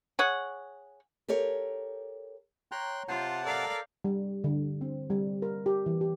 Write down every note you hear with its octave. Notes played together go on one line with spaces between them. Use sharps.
G#4 C#5 F#5
G4 A4 A#4 C#5
C#5 G5 A#5 C6 F#6
C3 F4 C5 F#5 A5
A4 A#4 D5 F5
G3
D3
C4
G3
A#4
G4
E3
G4